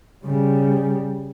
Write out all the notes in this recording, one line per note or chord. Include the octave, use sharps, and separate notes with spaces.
C#3 G3